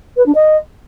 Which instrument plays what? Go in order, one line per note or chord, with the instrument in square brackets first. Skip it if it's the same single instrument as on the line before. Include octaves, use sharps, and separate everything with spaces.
[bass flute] B4
D4
D#5